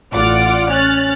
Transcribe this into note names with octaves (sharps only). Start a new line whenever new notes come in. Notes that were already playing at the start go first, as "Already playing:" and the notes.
A1 F4 D5 F#5 D6 F6
C#4 F6 F#6 A6